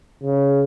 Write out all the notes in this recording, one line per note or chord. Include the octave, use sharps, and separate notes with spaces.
C#3